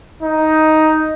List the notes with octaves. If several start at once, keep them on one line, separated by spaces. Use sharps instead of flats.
D#4